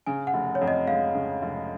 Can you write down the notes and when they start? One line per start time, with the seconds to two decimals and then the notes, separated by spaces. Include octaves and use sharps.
0.06 C#3 G#5
0.27 F#5
0.34 F1
0.55 C#5
0.61 F2
0.68 D#5
0.87 G#3 F5
1.14 C#3
1.42 F1